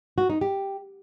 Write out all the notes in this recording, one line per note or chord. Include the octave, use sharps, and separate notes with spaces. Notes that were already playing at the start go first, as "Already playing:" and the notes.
F#4
D#4
G4